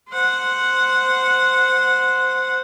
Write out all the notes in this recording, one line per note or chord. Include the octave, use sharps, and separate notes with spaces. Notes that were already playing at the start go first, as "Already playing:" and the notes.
C5 F#5